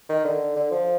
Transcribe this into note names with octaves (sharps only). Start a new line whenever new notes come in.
D#3
D3
D3
F3